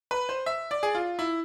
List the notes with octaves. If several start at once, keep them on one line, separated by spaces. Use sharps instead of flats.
B4
C5
E5
D5
G#4
F4
E4